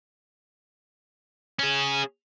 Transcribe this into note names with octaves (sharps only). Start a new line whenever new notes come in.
C#4 G#4